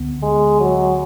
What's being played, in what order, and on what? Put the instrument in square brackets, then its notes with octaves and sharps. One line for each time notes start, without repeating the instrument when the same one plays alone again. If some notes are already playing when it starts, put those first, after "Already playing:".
Already playing: [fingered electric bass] D2 D3 B3
[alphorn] G#3
F#3